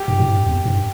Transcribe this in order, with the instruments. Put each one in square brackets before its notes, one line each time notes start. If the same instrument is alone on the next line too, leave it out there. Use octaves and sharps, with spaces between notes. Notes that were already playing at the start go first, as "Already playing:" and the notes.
Already playing: [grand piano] G4
[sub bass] G2
A2
G2
E2
G2